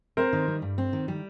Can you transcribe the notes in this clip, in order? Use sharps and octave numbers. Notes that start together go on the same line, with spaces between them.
C4 A#4 C5
D#3
G3
G2
C4
D#3
G3